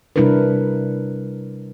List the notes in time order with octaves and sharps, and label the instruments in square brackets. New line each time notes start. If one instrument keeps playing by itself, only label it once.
[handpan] C3 G3 D4 E4 A#4 B4